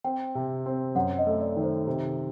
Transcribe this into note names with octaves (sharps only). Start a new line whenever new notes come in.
C4 G5
C3
C4
F#2 F#5
D#5
A3
D5
D#3
C5
C3 C5